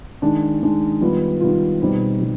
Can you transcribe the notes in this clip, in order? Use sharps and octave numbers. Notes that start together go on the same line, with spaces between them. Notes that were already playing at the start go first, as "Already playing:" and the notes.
D#3 G#3 D4
D#3 G#3 D4
D#3 G3 B3 F4
D#3 G3 B3 F4
B2 G3 C4 D#4 B4
B2 G3